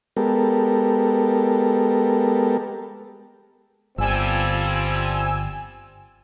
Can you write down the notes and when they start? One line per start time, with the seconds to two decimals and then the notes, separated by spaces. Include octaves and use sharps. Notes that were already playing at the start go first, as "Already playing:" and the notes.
0.17 G#3 B3 G4 A4 A#4
3.98 G1 F3 G3 C4 G#5 E6